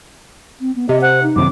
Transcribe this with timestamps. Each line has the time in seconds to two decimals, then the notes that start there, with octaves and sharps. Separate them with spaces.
0.61 C4
0.76 B3
0.89 C3 D#5
1.01 C5 F#5
1.23 D#4
1.36 F#2 C3 D#3 D6